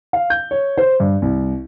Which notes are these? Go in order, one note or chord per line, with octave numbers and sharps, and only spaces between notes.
F5
G6
C#5
C5
G2
C2